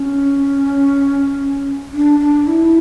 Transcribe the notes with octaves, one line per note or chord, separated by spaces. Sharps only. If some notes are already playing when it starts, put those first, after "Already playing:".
Already playing: C#4
D4
D4
E4